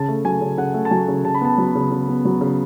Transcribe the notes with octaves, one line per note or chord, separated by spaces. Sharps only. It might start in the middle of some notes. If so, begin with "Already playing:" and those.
Already playing: C#3 A5
A3
F#3 G#5
C#3
C#3 F#5
A3
A5
F#3 G#5
C#3
C#3 A5
B5
B3 A5
F#3
C#3
C#3
B3
F#3
C#3